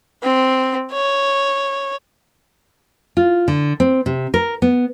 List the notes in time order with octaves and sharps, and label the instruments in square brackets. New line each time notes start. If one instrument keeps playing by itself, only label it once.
[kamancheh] C4
C#5
[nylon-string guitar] F4
D3
C4
C3
A#4
B3